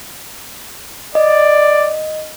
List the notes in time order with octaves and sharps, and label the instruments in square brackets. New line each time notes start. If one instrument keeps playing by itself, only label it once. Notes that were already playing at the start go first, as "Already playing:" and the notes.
[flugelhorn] D5 [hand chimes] D#5